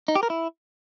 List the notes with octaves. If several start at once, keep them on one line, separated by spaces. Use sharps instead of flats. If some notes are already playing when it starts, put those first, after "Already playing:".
D#4
G4
A#4
E4